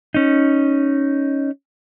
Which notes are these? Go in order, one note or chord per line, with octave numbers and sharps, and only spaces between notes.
C#4 D#4